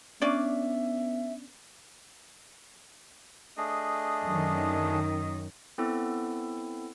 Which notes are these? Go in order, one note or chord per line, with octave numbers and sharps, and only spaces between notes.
B3 C#4 D4 D5 E5
A3 D4 G#4 D#5
F#2 D#3
B3 C4 E4 A4